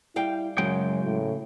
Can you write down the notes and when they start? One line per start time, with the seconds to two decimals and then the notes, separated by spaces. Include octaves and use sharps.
0.16 G3 E4 F5 G5
0.58 F#2 C#3 F#3 G#3 G5
1.04 A2